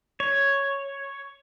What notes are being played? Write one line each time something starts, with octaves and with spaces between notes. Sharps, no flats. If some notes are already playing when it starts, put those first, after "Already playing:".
C#5